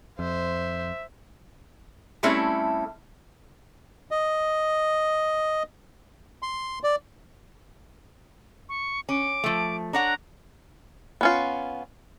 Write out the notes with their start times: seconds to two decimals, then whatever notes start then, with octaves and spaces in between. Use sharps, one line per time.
0.19 F2 C5 E5
2.23 G3 A3 C4 C#4 E4 A4
4.11 D#5
6.42 C6
6.83 D5
8.69 C#6
9.09 C#4 D6
9.44 F3 A3
9.93 D4 C#5 F#5 A#5
11.21 B3 C#4 F4